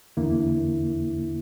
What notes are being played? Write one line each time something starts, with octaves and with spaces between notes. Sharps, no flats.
E2 D3 A#3 E4